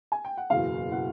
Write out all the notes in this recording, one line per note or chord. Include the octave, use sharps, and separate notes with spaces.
G#5
G5
F#5
F#1 E2 B2 F5
B2 F#5